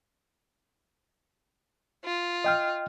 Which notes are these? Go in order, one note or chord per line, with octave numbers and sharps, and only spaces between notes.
F4
D#5 G5 F6